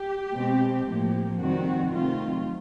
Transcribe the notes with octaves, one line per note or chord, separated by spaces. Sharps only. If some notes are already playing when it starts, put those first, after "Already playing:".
Already playing: G4
B2 G#3 C4
A2 F3 A#3
F2 C3 D#3 G3 C4 F#4
C3 D#3 F#3 A3 C4 F4